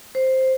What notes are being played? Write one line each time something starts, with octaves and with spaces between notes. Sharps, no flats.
C5